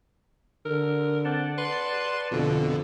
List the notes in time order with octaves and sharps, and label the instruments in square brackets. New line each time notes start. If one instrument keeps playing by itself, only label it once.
[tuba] D3 [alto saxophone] A#4
[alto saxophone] C4 [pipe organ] D5 F#5 A5
[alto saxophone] B4 [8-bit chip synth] C6
[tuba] F2 [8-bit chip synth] B2 D3